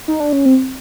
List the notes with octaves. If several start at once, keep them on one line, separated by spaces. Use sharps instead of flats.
D#4
D4
C#4
C4